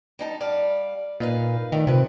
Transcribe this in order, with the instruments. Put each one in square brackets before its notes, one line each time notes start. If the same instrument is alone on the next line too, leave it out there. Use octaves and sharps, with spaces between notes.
[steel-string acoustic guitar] G3 D#4 A5
G3 D5 F5
[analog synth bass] A#2 [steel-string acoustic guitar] D#4 B4 F5
[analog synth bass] D#3 [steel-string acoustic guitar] A3 D5
[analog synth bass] C3 [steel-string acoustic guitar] F3 B4